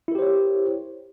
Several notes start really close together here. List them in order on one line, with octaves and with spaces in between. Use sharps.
E4 A#4 G4 C5 C#5